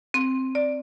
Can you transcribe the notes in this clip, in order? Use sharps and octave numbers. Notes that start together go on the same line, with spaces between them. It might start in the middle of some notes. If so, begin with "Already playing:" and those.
C4
D5